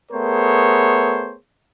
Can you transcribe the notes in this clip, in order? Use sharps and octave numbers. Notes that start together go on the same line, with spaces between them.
A3 B3 G#4 A#4 C5 C#5